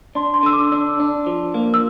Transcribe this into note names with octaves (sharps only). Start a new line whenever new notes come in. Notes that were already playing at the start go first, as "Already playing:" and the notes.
D4 C6
C6
D3 E6
D6
D4 E6
D4
F3
A#3
E6